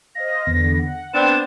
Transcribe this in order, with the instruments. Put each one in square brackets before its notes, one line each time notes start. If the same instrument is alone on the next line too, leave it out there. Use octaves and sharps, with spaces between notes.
[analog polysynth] C5 D#5 F5 [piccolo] A#6
[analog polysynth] E2 D3 B3
F#5
[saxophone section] B3 C4 D4 [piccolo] E7